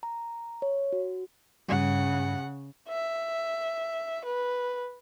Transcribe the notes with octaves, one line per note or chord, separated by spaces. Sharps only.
A#5
C#5
F#4
G2 C#3 G3 F#5
E5
B4